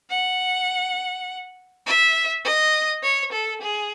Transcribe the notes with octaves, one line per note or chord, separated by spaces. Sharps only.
F#5
E5
D#5
C#5
A4
G#4